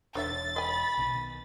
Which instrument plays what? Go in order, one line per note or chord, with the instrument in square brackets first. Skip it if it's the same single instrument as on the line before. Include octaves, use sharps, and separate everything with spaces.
[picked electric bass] E1 [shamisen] D4 C#5 E5 [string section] A6
[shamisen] D#5 G#5 [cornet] B5
[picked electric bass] B1 B2 D#3